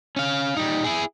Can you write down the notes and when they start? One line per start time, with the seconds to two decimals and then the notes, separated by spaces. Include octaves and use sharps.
0.16 C#4 F5
0.57 G3 D#4
0.84 E4 G#4